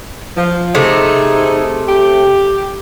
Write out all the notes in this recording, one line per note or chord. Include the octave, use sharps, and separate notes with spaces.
F3
C3 A3 D#4 G#4
G4